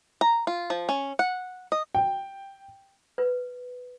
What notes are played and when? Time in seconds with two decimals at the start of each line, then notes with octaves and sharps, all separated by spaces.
0.21 A#5
0.47 F4
0.70 F3
0.89 C#4
1.19 F#5
1.72 D#5
1.95 G5
3.18 B4